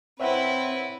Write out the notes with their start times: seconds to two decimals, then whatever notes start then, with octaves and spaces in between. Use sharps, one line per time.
0.20 C4 E4 B4 C#5 E5 F#5